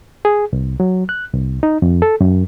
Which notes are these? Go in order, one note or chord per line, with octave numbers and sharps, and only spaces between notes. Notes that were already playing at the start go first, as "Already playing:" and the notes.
G#4
C2
F#3
F#6
C2
D#4
F2
A4
F#2